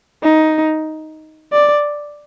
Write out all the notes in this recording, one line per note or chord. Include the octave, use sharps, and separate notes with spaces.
D#4
D5